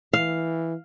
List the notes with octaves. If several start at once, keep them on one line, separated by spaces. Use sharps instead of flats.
E3 F5